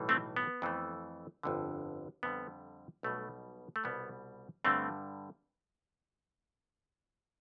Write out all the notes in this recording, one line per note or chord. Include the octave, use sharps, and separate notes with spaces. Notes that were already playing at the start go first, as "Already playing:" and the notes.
Already playing: B1 A2 E3 G3
A3 C4
B3
F2 E3 A3
G1 F2 D3
F2 D3 G3 B3
B1 B2 G3 A3
A3
C2 B2 G3 B3
G2 D3 G3 A3 C4